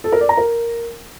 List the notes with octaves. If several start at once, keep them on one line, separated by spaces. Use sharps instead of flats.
A4
A#4
D5
A#5
A#4